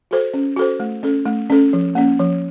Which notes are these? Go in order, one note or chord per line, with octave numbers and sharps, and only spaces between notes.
F#4 A4 C5
C#4
F#4 A4 C5
A3
C#4 A4
A3
C#4 A4
F3
A#3 C#4
F3